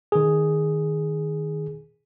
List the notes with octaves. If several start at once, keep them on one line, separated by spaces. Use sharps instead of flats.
D#3 G#4